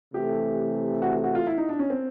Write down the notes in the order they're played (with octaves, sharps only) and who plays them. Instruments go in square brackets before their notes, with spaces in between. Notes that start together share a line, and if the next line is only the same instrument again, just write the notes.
[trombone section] C3 E3 A3 [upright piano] G4
[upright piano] F#4
F#4
F4
E4
D#4
D4
C#4
C4